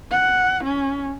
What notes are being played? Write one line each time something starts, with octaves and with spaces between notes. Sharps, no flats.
F#5
C#4